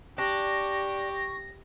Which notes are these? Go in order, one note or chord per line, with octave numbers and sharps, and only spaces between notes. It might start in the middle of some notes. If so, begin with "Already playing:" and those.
D4 G4 C#6 A#6